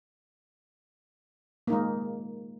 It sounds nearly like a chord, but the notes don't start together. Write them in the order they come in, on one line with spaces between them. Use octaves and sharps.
A#3 D#4 G#3